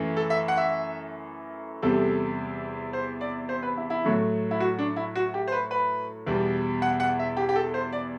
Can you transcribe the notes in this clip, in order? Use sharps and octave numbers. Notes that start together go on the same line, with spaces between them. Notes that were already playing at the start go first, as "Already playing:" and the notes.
Already playing: F#2 E3 A3
A4
E5
F#5
E5
E2 C3 G3 A4
C5
D5
C5
B4
E4
E4
A2 F#3 A3
E4
F#4
D4
E4
F#4
G4
C5
B4
B4
E2 B2 G3
F#5
F#5
E5
G4
G4
A4
C5
D5